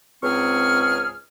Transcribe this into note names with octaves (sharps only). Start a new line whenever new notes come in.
C#2 G#2 C4 G#4 C#6 F6